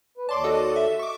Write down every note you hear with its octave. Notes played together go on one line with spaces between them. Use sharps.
B4
D#2 C#5 D5 A5 C6 D6
F#4 A4 D#5
E5
C#6 D6